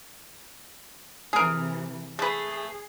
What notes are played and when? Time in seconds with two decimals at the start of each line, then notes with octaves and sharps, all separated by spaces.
1.33 C3 E3 G#4 A#4
2.19 A3 G#4 B4